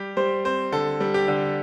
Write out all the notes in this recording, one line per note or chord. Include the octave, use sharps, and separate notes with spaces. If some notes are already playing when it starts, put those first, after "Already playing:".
Already playing: G3 G4
G3 C5
C4 C5
D3 A4
G3
G4
D3